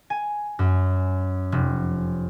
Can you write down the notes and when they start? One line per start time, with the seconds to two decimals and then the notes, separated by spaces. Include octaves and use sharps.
0.10 G#5
0.59 F#2
1.52 F1